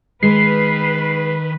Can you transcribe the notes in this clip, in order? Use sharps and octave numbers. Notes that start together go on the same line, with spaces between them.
D#3 G#3 B4 C7